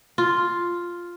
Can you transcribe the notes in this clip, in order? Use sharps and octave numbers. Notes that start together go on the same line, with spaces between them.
F4